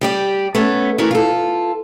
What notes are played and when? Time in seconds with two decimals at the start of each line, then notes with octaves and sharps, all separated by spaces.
0.01 G3 G4 D5
0.55 A3 B3 C#4
0.98 E3 A3 F#4 A#4
1.11 F4 A4